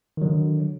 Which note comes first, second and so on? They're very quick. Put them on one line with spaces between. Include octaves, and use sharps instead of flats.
D#3 F#3 D3